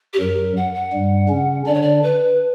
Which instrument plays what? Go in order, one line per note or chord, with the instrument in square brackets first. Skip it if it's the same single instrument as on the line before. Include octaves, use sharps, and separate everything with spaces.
[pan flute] G4
[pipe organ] F#2 F#3 [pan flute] A#4
[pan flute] F#5
F#5
[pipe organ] G2 G3
C#3 C#4
[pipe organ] D3 D4 [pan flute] D5
[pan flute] C#5
D5
B4